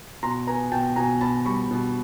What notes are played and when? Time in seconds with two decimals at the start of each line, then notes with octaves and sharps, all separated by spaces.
0.23 B2 A#5 C6
0.47 B3 G#5 A#5
0.72 B2 G5 A5
0.96 B2 G#5 A#5
1.21 B2 A5 B5
1.46 G3 B5 C#6
1.71 B2